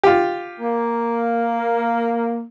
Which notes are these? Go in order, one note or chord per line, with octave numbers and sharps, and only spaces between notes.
F4 G4
A#3